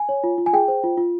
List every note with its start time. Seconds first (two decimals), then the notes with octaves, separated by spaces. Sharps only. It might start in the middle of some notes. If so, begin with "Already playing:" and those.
Already playing: G#5
0.09 C#5
0.24 F4
0.38 F4
0.46 G#5
0.53 G#4 G5
0.68 C5
0.84 F4
0.97 F4